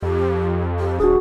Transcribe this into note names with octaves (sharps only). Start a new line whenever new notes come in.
F2 G4
G4
D#1 D4 F#4 G#4